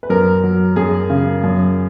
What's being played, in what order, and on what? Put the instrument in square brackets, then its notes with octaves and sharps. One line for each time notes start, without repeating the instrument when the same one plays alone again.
[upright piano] B4
F#2 A#4
F#3
F#2 G#4
C#3
F#2